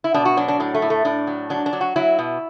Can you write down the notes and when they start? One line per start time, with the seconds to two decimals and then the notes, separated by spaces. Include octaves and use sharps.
0.04 E4
0.14 B2 D4
0.25 F#4
0.37 F#3 D4
0.48 D4
0.60 A2 D4
0.75 A3
0.82 A2
0.90 A3
1.05 A2 D4
1.27 F#3
1.50 F#3 D4
1.66 D4
1.73 F#3
1.81 F#4
1.96 F#3 E4
2.19 B2